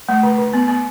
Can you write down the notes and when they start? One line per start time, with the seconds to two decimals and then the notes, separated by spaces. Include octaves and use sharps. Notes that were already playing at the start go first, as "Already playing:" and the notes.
0.09 A3
0.23 D3
0.38 D3
0.53 B3
0.68 B3